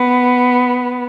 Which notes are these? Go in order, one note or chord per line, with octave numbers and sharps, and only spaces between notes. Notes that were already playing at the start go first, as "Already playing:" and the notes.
Already playing: B3